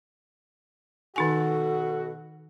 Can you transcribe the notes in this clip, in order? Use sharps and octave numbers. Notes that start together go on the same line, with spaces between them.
B2 D#3 D#4 F#4 A4 G#5